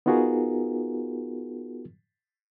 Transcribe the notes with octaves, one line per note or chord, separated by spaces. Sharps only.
B3 D#4 F4 F#4 G#4 A#4